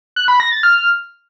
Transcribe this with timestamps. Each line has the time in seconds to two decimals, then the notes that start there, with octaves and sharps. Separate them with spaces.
0.16 F#6
0.28 B5
0.40 A#6
0.52 A6
0.63 F6